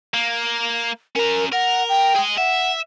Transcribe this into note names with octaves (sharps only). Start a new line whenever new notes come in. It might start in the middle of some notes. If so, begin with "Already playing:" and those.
A#3
C#4 A#4 A#5
A#4 F#5
G5
G#4 D#5
E5 F#5